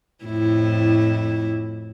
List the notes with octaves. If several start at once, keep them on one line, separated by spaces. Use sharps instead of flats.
F2 A2 E4